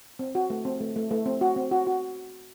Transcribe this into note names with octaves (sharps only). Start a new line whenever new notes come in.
C4
F#4
A3
C4
A3
A3
A3
C4
F#4
C4
F#4
F#4